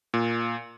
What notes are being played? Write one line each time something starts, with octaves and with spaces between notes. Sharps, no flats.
A#2